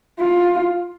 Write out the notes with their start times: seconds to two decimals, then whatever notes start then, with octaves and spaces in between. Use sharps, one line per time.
0.20 F4